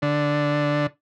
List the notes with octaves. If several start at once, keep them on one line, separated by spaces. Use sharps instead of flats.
D3